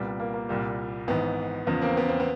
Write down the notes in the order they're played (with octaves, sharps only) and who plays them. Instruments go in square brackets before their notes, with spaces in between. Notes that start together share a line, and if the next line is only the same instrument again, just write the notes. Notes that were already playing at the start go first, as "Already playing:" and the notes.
Already playing: [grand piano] C2 A#2 G3 B3
A#3
A#3
C2 A#2 G3
G#1 G#2 E3 B3
E2 C#3 F3 B3
A#3 C4
B3
C4
B3